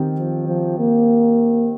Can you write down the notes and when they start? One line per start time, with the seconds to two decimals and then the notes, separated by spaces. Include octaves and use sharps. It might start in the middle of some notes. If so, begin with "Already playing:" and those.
Already playing: D#3 C4 G4
0.18 F3
0.47 F3
0.79 A#3